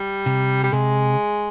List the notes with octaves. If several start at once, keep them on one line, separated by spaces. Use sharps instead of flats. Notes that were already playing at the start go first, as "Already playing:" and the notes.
Already playing: G3
C3
G3
C3 G#3